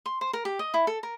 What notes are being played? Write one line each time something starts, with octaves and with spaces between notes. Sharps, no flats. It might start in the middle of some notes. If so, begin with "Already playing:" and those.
C6
C5
A#4
G4
D#5
E4
A4
A#4